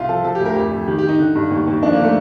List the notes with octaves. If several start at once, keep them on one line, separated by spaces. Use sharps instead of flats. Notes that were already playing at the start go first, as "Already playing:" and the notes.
Already playing: C2 F4
F3 A4
F3 A4
G4
D2
A#4
F2 G4
F2
D#3 G4
G4
D#3
D#4
D3
G2
D#2
D#2
F3 D4
A#3
D3
A3